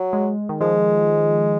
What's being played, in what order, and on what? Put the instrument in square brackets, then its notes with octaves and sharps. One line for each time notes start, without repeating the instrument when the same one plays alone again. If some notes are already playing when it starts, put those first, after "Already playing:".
Already playing: [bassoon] F#3
[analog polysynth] G#3
D#3
[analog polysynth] F3 [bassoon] G#3